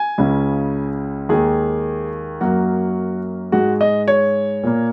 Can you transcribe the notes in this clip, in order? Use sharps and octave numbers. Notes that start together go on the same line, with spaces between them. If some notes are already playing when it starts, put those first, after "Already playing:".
Already playing: G#5
C#2 C#3 G#3
D#2 D#3 G#3 G#4
F#2 F#3 A#3 F#4
G#2 G#3 F#4
D#5
C#5
A#2 A#3